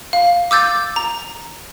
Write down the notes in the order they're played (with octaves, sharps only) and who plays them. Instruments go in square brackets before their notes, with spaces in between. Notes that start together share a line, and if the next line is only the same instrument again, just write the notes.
[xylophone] F5
D6 E6 G6 A6
A#5